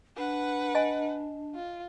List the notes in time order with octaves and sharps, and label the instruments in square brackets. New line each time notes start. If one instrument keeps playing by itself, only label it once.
[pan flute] D4 [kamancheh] B4 F#5
[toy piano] D#5 G#5
[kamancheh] F4